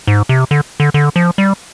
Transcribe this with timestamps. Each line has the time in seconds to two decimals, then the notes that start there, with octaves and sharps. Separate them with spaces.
0.07 G#2
0.29 C3
0.51 D3
0.80 D3
0.94 D3
1.16 F3
1.38 G3